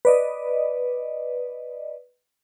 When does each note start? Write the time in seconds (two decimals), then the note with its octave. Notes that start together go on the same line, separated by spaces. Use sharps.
0.05 B4 D5 D#5